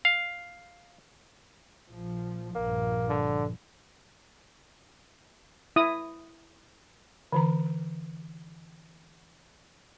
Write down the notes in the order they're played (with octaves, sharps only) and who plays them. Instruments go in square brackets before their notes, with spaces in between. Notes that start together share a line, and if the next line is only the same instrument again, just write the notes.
[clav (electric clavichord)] F5
[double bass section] A#1 F3
[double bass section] A#1 G2 F3 [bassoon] A#3
[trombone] D3
[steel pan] E4 D#6
[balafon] D3 E3 A#5